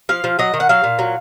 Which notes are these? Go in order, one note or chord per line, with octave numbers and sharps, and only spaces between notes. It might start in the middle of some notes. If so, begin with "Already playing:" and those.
F3 F5
F3
F#3 D#5
D#3
F#5
F#3 F5
A#2
F#3